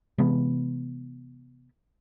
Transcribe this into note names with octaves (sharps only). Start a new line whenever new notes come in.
C3 E3 G#3 B3